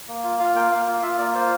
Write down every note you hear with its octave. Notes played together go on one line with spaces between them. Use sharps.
A#3
F4
F4 F5
A#3 G5
A#3 F5
F4
F4 E5
A#3 D5
F4 C5